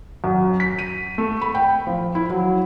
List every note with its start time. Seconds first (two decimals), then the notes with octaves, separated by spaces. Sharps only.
0.24 F#2
0.60 B6
0.79 D#7
1.18 A3
1.42 B5
1.55 G5
1.87 F3
2.15 E4
2.30 F#3